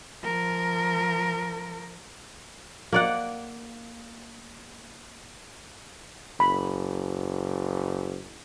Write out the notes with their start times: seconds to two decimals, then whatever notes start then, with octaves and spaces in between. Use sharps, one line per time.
0.23 F3 A#4
2.92 A#3 D5 F#5
6.40 F#1 B5